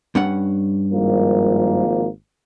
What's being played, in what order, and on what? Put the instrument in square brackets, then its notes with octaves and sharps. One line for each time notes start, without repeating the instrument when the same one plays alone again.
[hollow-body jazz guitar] G2 C#4 F#5
[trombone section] G#1 F3 A#3